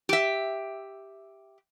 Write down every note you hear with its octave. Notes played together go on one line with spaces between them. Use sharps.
G4 E5